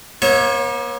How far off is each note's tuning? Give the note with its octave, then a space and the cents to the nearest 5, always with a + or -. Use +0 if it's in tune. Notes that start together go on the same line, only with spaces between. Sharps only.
A#3 +45 C#5 -30 E5 -35